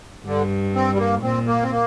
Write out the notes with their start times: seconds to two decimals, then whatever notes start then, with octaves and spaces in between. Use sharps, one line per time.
0.26 G2 D3
0.75 C4
0.92 G3
0.98 A#3
1.22 A#2 C4
1.47 A#3
1.63 C4
1.71 A#3